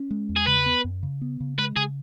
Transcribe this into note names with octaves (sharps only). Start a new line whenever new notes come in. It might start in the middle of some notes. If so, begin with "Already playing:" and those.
Already playing: C#4
G#3
E2
G#4
C#3 B4
B3
F#2
C#3
B3
C#3
G#3 B4
C#3 G#4